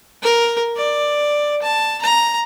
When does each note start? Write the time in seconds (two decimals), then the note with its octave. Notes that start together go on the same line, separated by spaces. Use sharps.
0.23 A#4
0.76 D5
1.62 A5
2.02 A#5